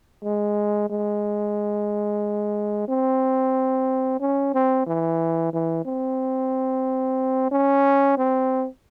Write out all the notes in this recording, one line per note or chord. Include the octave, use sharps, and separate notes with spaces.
G#3
G#3
C4
C#4
C4
E3
E3
C4
C#4
C4